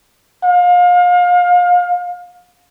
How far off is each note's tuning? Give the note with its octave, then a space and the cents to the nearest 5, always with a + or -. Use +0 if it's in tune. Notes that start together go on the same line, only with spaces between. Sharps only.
F5 +30